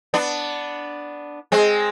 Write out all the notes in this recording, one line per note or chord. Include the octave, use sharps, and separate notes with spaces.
B3 D4
G#3 C4